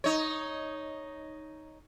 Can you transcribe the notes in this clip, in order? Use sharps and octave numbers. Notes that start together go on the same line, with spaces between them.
D#4 C#5